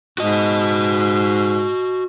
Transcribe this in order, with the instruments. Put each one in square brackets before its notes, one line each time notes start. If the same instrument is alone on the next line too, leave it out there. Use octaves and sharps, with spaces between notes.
[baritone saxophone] G#2 [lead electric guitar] F#4 D#5